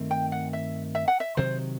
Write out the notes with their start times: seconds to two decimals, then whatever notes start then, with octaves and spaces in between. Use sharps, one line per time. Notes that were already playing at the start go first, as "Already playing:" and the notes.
Already playing: G2 D#3 A3 C4
0.11 G5
0.32 F#5
0.53 E5
0.95 E5
1.08 F#5
1.20 E5
1.37 C3 D#3 F#3 C5